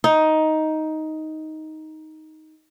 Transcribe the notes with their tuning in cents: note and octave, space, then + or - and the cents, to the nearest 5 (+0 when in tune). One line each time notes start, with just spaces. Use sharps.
D#4 +10